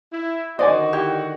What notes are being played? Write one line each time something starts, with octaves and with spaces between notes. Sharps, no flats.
E4
D3 D#3 F#4 C5 D5 D#5 G#5
E4 G4